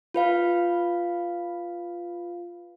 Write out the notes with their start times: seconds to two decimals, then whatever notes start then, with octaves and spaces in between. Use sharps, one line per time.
0.14 F4 B4 F5